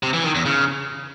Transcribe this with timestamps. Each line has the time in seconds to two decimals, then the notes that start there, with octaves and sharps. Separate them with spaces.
0.03 C3
0.13 E3
0.24 D#3
0.35 E2
0.45 C#3